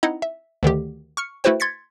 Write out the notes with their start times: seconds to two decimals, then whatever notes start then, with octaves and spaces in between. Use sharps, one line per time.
0.03 C4 D#4 E4 D#5 F#5 A#5
0.22 E5
0.63 D2 D3 D#3 G4
1.17 C#6 F6 C#7
1.44 A3 E4 F#4 B4 C5 G5
1.60 C6 G#6 A6 B6 C#7